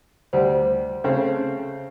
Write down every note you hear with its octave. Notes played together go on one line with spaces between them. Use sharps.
D2 G3 C5
C#3 A3 C4